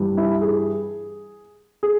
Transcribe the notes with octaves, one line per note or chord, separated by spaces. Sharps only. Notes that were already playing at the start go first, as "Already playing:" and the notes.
Already playing: G2 E3 G3
E4
G#4
G#4